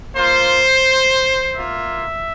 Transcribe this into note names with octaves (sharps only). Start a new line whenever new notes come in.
A#3 F4 C5
A#3 F4 E5